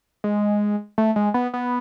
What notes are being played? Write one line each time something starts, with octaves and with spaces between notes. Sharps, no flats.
G#3
A3
G#3
B3
B3